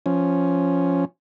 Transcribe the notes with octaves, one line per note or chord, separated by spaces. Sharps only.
F3 C#4